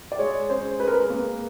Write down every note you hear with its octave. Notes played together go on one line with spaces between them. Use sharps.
D5
G#3 C#5
C#4 C5
G#3 B4
A#4
B4
A#3